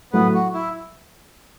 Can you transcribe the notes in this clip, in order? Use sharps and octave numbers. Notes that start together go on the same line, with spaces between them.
A2 F#3 A3 B3 B4
F#4
E4